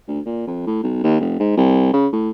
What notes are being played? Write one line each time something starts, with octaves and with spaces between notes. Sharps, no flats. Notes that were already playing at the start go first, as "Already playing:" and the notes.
D2
A#2
F2
A2
B1
D#2
F1
G#2
C2
C#3
A2